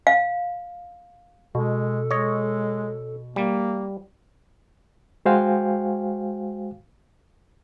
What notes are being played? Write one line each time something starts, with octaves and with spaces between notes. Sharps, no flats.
F5
B2 G#3 A4
G#3 C#5 D#5
G3 A#3
G#3 F#4 C5 F5 G5 G#5